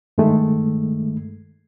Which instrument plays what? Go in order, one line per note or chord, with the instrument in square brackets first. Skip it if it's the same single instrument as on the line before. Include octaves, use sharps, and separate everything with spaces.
[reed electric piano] G2 D#3 G#3 A3